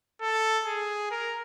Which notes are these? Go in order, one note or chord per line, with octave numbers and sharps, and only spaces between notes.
A4
G#4
A#4